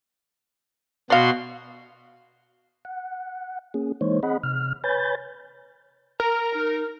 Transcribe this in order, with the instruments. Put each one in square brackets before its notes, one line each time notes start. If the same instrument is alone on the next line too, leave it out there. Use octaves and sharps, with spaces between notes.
[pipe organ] B2 F#4 C6 [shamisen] D5 F5
[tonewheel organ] F#5
A#3 C#4 G#4
E3 G#3 A#3 D#4 C5 C#5
C4 G#4 D#5 F#5 B5
C3 F6
B4 C#5 G#5 B5 G6 A6
[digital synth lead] A#4 [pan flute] A#5
[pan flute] D#4